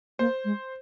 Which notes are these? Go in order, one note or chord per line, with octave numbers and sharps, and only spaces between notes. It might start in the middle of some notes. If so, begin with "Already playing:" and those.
A#3 C5
G#3